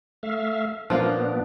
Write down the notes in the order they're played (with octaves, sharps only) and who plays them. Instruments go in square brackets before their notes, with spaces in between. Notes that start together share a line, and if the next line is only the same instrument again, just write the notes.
[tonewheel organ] A3 E5 F5
[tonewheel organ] A#2 B3 D4 [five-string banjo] F3 A#3 F4